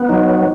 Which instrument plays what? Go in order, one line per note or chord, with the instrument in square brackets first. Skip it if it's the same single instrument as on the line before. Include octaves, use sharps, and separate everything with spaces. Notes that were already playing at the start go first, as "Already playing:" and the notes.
Already playing: [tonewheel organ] B3
[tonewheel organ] F#3 [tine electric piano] D#4